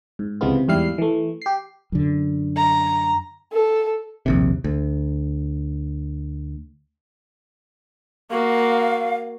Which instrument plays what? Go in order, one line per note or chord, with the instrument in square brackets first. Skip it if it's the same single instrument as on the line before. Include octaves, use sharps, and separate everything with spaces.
[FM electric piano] G#2
C#2 C3 E3 G#3 B3 F4
C3
E2 G#2 G3 E4 F5 C7
E3 A3
G4 C7
[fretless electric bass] F#2 D3
[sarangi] A#5
[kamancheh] A4
[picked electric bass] A#1 D#2 C3
D2
[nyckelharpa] A#3 F#4 [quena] F5